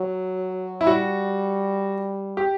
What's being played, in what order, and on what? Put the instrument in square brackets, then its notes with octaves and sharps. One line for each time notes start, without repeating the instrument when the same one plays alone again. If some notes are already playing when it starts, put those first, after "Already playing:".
Already playing: [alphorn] F#3
[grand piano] E4
[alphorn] G3 [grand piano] F#4
[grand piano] G4